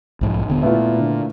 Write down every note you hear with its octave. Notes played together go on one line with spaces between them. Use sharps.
B1 G#2 F3
D#1 D3 B3
A#2 A3 B3 E4 F4
D3